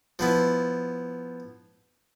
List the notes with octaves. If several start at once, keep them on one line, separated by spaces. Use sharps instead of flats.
F3 B3 E4